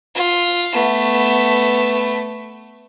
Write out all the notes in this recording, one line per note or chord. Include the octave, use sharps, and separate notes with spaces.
F4
A3 B3